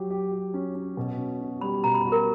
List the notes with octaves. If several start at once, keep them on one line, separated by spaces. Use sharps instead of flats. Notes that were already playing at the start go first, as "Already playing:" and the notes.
Already playing: F#3 G4
G4
G4
C#4
C#4
B2
C#4
F#4
G3 B5
B2 A#5
B5
F#4
A#4